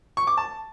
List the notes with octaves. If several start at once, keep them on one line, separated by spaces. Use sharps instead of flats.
C#6
D6
A5